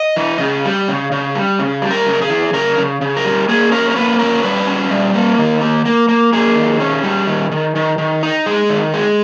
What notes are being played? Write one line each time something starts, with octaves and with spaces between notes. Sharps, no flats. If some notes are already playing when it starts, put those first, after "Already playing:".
Already playing: D#5
E3
C#3
G3
C#3
C#3
G3
C#3
G3
A#4
C#3
G#4
E3
C#3 A#4
C#3
C#3
A#4
G3
A#3 G#4
C#4 A#4
A#4
A#3 B4
C#4 A#4
G3 B4
C#4
G3
A#3
D#3
A#3
A#3
A#3
A#3 G#4
D#3
C#4
G3
D#3
D#3
D#3
D#3
D#4
G#3
D#3
G#3